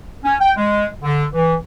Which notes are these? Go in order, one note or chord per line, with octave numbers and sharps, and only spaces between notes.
C#4
G5
G#3
D3
E3